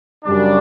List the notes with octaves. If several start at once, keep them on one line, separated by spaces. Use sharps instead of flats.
F#2 C#3 G3 D4